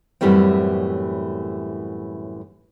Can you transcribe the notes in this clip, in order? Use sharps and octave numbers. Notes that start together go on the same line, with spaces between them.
F#2 A2 E3 G3 A3 C4